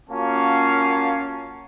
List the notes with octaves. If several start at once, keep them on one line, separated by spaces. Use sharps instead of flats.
A#3 C#4 F4 F#4 F5 A5